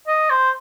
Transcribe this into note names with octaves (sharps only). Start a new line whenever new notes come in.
D#5
C5